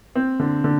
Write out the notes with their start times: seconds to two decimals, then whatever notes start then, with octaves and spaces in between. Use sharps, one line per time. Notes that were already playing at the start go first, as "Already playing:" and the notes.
0.15 C4
0.40 D3
0.64 D3